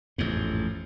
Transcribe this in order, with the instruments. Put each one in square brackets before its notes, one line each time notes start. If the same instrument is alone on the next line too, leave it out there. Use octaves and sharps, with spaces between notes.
[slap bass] A1 F2 G#2